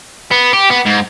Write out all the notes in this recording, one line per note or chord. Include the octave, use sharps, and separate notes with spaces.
B3
G4
B3
G#2